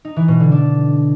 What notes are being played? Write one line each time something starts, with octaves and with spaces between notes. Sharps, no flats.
D#4
E3
B2
D3
D4